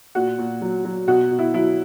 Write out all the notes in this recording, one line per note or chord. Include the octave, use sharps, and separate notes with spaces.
A#2 F#4
A#2
F#3
F#3
B2 F#4
B2
E4
F#3 E4